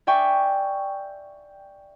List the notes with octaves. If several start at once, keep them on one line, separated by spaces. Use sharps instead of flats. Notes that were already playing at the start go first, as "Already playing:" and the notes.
D5 E5 G5 G#5 C#6